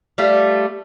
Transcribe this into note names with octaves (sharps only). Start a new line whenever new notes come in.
G3 A3 F4